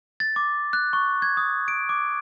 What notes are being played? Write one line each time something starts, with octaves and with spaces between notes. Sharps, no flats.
A6
D6
F#6
C#6
G#6
D#6
D7
D6